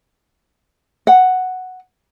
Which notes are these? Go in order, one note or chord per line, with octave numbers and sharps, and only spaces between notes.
F#5